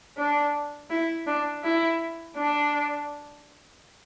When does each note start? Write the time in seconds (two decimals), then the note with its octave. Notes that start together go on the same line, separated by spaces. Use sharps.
0.17 D4
0.90 E4
1.27 D4
1.63 E4
2.37 D4